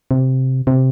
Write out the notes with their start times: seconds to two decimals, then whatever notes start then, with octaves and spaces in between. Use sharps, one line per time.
0.11 C3
0.67 C3